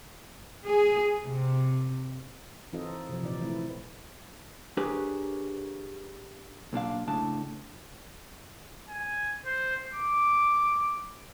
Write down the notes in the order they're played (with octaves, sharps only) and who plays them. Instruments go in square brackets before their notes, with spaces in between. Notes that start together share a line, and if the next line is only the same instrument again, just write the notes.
[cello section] G#4
C3
[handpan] E3 C4 D#4 F4 A4 D#5
C3 F3
A#2 E3 D#4 D5
E3 A3 C4 E4
[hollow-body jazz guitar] D4 G4 G#4 A#4 B4 C#5
B1 A#2 D4 F5
A2 C#3 D4 A5
[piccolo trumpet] G#5
C5
D6